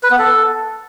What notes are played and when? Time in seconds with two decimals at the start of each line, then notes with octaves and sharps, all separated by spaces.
0.03 B4
0.11 B3
0.18 A4